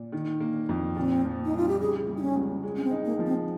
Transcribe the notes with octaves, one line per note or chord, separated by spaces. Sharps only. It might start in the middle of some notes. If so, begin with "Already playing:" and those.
Already playing: A#2
D#3
A#3
F2
A#2 C4
F3
D#4
C2
F4
G4
C#3 G#4
G3
D#4
C#4
C#2
G#3
C#4
C4
D#4
A#3
F3
C4